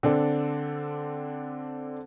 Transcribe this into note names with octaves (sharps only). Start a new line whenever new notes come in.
D3 C4 D4 A4